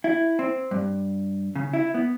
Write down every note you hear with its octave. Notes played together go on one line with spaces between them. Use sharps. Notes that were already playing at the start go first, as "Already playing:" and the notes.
E4
C4
G2
C#3
E4
B3